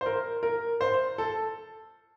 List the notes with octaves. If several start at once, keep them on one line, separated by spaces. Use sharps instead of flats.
C5
A#4
A#4
C5
A4